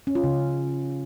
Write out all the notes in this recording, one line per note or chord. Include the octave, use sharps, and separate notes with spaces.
C#4
F4
C#3